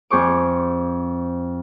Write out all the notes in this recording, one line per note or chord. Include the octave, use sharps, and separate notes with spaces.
F2 G#4 C5 C#6 D6